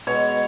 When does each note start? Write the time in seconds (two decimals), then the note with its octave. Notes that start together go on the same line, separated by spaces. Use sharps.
0.07 B2 G#3 C#5